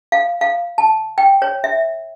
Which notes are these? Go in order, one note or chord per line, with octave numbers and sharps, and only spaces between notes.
F5
F5
A5
G5
C#5
E5